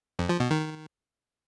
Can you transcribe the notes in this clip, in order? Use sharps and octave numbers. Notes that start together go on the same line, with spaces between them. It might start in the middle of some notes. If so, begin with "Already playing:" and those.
F2
F3
B2
D#3